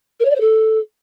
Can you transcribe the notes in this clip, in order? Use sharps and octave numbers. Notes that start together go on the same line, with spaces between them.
A#4
C#5
D5
C5
A4